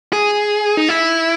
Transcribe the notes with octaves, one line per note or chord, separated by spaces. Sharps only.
G#4
D#4
E4